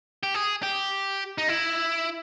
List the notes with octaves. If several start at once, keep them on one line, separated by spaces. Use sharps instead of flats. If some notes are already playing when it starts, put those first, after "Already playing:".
G4
G#4
G4
D#4
E4